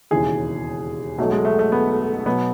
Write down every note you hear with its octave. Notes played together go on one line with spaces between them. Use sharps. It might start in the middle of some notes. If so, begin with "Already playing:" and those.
E1 D#2 C#3 E3 G#4
B1 B2 F#3 A3
G#3
A3
A3
B3
B2 F#3 B3